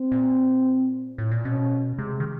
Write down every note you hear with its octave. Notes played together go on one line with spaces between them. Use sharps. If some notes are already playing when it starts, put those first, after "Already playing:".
Already playing: C4
A#2
A2
A#2
B2 C#4
C3 G#3
D#3